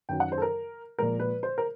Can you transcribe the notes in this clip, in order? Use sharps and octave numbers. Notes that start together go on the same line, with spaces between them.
F#2 D#3 F#3 G5
F#5
C5
A4
A#4
A#2 F3 G#3 A#4
B4
C5
A#4